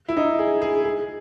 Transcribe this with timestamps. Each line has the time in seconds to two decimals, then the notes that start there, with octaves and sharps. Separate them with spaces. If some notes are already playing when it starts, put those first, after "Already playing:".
0.08 E4
0.17 D#4
0.39 G#4
0.62 G#4
0.84 G#4